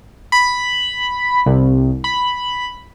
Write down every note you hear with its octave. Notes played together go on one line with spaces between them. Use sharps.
B5
C2
B5